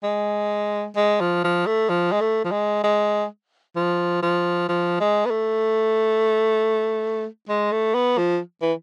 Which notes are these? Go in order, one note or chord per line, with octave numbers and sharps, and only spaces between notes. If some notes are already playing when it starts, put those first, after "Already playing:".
G#3
G#3
F3
F3
A3
F3
G#3
A3
F3
G#3
G#3
F3
F3
F3
G#3
B3
A3
G#3
A3
B3
F3
E3